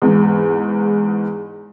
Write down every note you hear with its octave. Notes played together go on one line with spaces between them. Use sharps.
E2 G#2